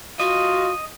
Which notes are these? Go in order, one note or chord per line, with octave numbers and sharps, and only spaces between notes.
F4 F#4 D#5